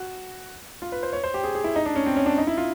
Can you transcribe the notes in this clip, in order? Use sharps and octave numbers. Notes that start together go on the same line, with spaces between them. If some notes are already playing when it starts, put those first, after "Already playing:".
Already playing: F#4
F4
B4
C5
C#5
C5
G4
G#4
G#4
E4
D#4
D4
C#4
C4
C#4
D4
D#4
E4
F4